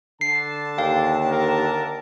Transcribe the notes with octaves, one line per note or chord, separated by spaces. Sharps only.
D3 A5 C7
D#2 F5 G5
A#4